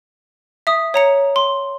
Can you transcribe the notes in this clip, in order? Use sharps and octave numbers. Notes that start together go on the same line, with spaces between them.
E5 D#6
C#5 A#5 C#7
C6